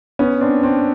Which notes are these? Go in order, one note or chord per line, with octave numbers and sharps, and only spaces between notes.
B3 C#4
C4 D4
C4 D4